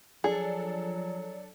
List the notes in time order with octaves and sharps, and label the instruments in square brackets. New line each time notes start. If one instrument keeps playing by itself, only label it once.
[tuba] F3 [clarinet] F#3 [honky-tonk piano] D4 A4 [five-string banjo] G#4